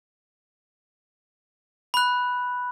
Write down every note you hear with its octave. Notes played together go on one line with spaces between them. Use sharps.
B5 F#6